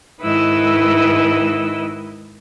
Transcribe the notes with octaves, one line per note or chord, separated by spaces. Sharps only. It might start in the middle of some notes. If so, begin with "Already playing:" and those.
G#2 D#3 E4 B4 D#5 E6